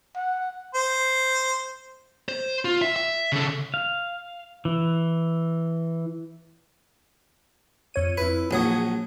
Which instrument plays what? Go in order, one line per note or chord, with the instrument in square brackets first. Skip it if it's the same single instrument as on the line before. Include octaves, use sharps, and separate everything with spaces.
[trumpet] F#5
[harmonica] C5
[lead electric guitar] C5
F4
E5
E5
C#3 A4
[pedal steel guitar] F5
E3
[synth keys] F2 C#5 D#7
[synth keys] F2 E4 [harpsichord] B4
[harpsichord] A#1 F#3 [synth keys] G#4 C#5 D#6